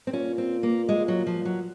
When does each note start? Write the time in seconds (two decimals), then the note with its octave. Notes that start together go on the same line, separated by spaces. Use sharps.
0.07 C4
0.13 A#2 C#4
0.38 C4
0.63 A#3
0.89 G#3
1.08 F#3
1.27 F3
1.45 F#3